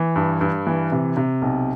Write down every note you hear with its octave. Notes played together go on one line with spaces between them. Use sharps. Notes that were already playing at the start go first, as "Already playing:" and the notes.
Already playing: E3
G2
G2
E3
C3
C3
B1